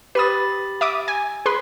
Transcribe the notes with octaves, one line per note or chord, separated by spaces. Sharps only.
G4 B4 B5 D#6 A6
E5 D6 D#6
G#5
G#4 B4 C6